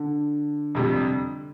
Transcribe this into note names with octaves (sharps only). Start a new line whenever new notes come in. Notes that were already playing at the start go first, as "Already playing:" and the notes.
Already playing: D3
F2 C3 G3